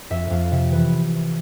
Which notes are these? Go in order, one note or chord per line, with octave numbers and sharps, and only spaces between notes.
F2 E5
F2 F5
C3 E5
E3 B4